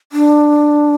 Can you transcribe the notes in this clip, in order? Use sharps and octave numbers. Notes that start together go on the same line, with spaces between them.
D4